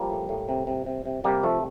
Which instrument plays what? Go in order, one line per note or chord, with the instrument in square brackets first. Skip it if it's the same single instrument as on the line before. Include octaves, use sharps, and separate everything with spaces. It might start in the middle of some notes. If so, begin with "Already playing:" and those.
Already playing: [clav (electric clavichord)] F3 G3 A#3
A2
A2
C3
C3
C3
C3
C3 G3 A#3
F3 A3